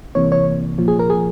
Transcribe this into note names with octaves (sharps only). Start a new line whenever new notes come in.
C2 C3 E3 A#3 C#5
C#5
C2 A#2 F3
G#4
A#4
G#4